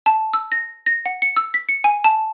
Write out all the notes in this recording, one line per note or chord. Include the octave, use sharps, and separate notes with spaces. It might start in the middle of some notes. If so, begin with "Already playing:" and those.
A5
E6
A#6
A#6
F#5
C#7
E6
B6
C#7
G#5
A5